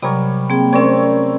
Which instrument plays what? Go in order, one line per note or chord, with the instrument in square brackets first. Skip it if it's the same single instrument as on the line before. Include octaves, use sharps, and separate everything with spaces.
[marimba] C3 F#3 [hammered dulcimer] G3 A#4 C#5
[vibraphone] A#3 G5 [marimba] C4 G#4
[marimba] A3 [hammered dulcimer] C4 C#5 [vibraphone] C#4 A#4 D5